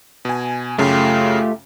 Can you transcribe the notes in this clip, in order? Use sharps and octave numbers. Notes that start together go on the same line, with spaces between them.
B2 G#5
F#2 C#3 A3 F4 G4